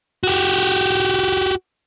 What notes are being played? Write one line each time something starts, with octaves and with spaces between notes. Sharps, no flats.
F#4 G4